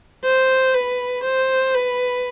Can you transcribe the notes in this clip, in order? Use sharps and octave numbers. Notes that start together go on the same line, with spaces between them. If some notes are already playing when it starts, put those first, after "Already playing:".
C5
B4
C5
B4